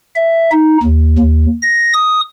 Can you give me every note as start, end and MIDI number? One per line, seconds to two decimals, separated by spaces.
0.15 0.50 76
0.52 0.78 63
0.83 1.17 39
1.19 1.46 39
1.62 1.93 94
1.94 2.21 87